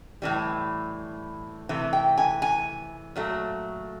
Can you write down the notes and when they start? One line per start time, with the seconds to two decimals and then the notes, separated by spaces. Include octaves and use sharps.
0.22 A2 E3 G3
1.69 C3 E3 A3
1.93 G5
2.18 G#5
2.42 G#5
3.16 A#2 F#3 A3